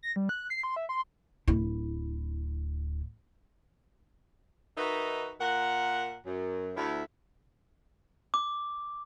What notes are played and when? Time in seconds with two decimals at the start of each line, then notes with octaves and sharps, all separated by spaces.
0.03 A#6
0.16 G3
0.29 F#6
0.50 C7
0.63 C6
0.76 E5
0.89 C6
1.48 D1 E4
4.77 D#3 D#4 F#4 B4 E5
5.40 A#2 A#4 F#5
6.26 F#2
6.77 D2 E4
8.34 D6